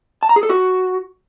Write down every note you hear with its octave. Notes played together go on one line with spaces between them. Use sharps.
A5
A#5
G#4
A4
F#4